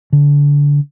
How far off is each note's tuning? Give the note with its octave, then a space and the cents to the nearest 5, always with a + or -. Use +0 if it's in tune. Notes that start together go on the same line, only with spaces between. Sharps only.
D3 -25